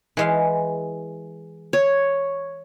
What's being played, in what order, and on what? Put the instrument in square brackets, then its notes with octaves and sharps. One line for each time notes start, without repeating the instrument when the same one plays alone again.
[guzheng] E3 G#3 F5
[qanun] C#5